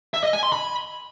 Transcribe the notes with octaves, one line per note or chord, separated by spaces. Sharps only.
E5
D#5
G#5
C6
B5